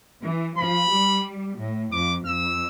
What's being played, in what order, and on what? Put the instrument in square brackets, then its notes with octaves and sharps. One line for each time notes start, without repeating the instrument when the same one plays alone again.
[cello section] E3
[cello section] F3 [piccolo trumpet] B5
[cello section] G3
A2
[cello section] F2 [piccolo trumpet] D6
[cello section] F2 [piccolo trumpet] E6